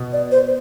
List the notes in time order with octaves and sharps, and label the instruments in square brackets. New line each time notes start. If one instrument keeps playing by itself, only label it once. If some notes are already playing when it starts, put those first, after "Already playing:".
Already playing: [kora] B2
[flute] D5
C5